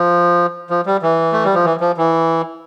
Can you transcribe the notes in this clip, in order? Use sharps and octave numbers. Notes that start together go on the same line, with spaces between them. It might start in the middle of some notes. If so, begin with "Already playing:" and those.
Already playing: F3
F3
G3
E3
A3
G3
F3
E3
F3
E3